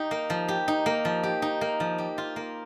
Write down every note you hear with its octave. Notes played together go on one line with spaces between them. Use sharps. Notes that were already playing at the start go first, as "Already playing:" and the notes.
Already playing: D#4 G4
A#3
F3
G4
D#4
A#3
F3
G4
D#4
A#3
F3
G4
F4
A#3